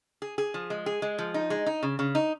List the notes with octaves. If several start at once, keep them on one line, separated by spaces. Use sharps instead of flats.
G#4
G#4
F3
G#3
G#4
G#3
F3
D#4
G#3
D#4
C#3
C#3
D#4